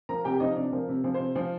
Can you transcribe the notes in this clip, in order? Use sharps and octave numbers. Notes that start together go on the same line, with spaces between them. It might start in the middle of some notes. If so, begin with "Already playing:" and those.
F3 A#4 A#5
C3 G4 G5
F3 D#4 D#5
C3 D4 D5
F3 A#4
C3
F3
C3 C5
F3